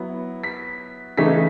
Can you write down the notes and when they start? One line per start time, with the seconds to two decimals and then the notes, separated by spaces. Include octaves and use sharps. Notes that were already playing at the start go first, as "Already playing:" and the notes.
Already playing: F#3 B3 E4
0.44 B6
1.17 C#3 E3 A3 D#4 B6